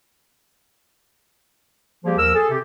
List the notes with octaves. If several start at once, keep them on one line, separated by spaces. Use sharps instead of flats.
F3 G3 A#3 G4 G#4
D#2 F3 A#4 E6
G#4 A4
C3 C4 G4